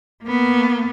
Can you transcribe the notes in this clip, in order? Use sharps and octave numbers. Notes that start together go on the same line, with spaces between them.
A#3 B3